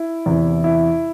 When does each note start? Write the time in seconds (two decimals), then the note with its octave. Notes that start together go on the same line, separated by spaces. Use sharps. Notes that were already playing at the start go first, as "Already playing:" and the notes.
Already playing: E4
0.26 E2 C3 E3
0.64 E4